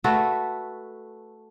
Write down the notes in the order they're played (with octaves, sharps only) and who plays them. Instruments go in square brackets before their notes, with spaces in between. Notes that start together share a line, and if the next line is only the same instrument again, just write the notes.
[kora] A3 F#4 A4 B4